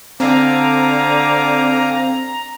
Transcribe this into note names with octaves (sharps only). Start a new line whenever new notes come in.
D3 C4 F5 G#5 A#5 D6